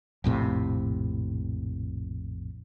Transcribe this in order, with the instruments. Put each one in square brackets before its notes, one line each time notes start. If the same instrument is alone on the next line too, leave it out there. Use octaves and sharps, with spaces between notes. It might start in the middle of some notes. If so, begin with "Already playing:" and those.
[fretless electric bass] A#1 F2 A2 C3